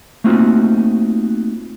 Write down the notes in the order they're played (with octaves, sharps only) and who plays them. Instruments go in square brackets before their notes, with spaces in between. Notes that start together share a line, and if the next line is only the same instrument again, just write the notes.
[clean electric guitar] A3 A#3 C4 D#4 F4 F#4